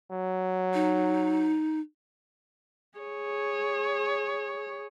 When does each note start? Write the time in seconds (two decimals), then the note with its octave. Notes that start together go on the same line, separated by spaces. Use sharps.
0.11 F#3
0.74 D#4
2.99 G#4 C#5